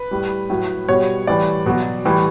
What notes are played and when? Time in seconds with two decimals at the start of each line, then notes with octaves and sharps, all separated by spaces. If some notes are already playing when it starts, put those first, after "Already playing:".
Already playing: B4
0.11 A2 G3
0.50 A2 F#3
0.89 B2 G3 C#5
1.27 A2 E3 G3 D5
1.66 B2 F#3
2.05 A2 E3 G3